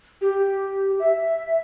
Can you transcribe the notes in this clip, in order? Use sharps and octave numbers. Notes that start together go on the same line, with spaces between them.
G4
E5